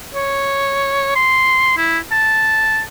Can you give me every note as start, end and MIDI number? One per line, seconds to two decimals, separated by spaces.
0.15 1.15 73
1.15 1.74 84
1.77 1.99 64
2.12 2.81 81